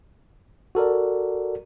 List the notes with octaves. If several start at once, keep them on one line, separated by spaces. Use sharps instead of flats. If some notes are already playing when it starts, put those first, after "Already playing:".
F#4 A4 A#4 D5